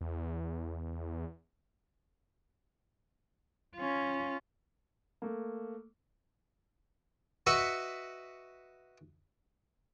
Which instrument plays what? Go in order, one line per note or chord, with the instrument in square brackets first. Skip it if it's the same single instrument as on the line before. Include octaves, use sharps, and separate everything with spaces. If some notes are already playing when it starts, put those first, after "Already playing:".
[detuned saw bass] E2
[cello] C#4 F4
[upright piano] A3 A#3
[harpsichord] F#4 B4 D#5 E5 C#6